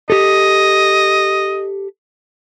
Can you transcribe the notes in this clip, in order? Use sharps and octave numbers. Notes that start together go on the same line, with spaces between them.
G4 A4 D#5